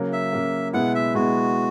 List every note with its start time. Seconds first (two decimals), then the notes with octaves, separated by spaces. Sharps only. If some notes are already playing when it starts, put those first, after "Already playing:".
Already playing: C#3 F#3 A#3
0.13 E5
0.33 C#3 F#3 A#3
0.73 B2 G#3 B3 E4 F#5
0.95 E5
1.15 B2 G#3 B3 E4 F#4